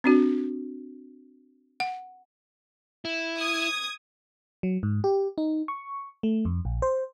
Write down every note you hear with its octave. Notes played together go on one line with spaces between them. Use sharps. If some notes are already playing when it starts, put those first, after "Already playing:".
C4 D4 F#4
F#5
E4
D#6 G#6
F#3
G#2
G4
D#4
C#6
A3
F2
A#1
C5